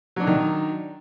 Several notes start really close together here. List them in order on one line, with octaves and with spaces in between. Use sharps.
F#3 D4 D#4 D#3